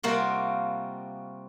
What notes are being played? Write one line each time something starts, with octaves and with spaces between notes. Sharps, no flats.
C3 G3 A#3 F4 F#4